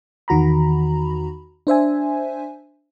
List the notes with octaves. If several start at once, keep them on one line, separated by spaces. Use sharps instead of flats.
E2 D#3 F#4 A#5 B5
D4 C5 E5 G#5